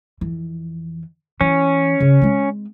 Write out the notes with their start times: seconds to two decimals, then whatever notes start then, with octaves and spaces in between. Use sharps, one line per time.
0.21 F2 E3
1.41 E3 C#4
2.00 C#3
2.22 G#3 C4